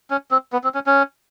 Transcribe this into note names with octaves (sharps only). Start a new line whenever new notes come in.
C#4
C4
B3
C4
C#4
C#4